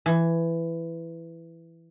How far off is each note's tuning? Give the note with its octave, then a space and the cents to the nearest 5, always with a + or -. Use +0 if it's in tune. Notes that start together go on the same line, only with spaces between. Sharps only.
E3 +10